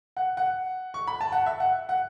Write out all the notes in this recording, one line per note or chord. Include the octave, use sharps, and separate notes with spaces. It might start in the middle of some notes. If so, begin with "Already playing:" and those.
F#5
F#5
C#6
B5
A5
F#5
E5
F#5
F#5